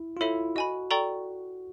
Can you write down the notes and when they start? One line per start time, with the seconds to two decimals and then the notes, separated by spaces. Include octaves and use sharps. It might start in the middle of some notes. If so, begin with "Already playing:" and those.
Already playing: E4
0.17 F4
0.21 E4 A4 C#5 E5
0.56 F#4 D#5 G#5 B5
0.91 A4 D5 G5 A#5 C#6